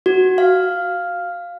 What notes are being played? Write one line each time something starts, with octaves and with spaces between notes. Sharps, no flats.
F#4
F5